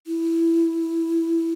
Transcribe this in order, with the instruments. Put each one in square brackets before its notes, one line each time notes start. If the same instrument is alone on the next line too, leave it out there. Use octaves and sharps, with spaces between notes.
[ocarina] E4